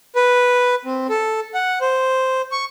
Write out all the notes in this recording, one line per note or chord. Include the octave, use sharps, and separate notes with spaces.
B4
C4
A4
F#5
C5
C#6